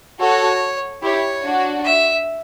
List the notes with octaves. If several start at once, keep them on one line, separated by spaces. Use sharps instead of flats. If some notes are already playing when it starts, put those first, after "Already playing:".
F#4 A4 C#5
E4 G4 C#5
D4 F#4
E5